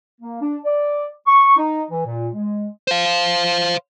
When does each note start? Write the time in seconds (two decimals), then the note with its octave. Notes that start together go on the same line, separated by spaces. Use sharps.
0.21 A#3
0.41 D4
0.65 D5
1.27 C#6
1.57 D#4
1.91 E3
2.05 A#2
2.34 G#3
2.87 C5 F5